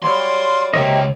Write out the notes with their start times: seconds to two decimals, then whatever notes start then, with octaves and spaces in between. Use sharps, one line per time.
0.02 F#3 G3 C#5 D5 F5 C6
0.74 C#2 C3 A#3 G4 C#5 D#5